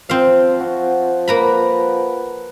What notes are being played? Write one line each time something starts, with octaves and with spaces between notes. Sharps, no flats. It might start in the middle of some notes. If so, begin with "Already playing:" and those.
F3 C4 F5
F#4
A#3 A#4 B4 A#5 B5